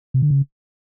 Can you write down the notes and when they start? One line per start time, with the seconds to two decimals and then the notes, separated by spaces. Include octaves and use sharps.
0.14 C3
0.22 D3
0.30 C#3